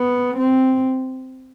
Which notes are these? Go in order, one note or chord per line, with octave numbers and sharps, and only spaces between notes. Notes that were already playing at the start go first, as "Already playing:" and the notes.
Already playing: B3
C4